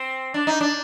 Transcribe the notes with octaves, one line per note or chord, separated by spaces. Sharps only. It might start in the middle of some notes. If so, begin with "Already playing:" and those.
Already playing: C4
D4
D#4
D4